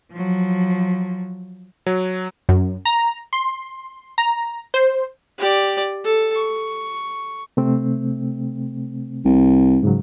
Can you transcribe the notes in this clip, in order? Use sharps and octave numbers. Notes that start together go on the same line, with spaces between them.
F3 F#3
F#3
F#2
A#5
C6
A#5
C5
G4 D5
A4
C#6
C3 A3 C4
C2
G#2 C#3 F#3